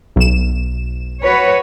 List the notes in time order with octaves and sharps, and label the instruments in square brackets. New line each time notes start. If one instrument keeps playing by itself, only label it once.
[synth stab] B1 E7
[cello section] F#4 B4 C#5